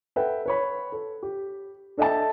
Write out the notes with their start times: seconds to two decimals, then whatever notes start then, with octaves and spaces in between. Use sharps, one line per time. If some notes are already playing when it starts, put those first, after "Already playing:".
0.16 A4 B4 E5 F#5 G5
0.46 B4 C#5 B5
0.92 A4
1.23 G4
1.97 D4 A4 D#5 E5 G5 A5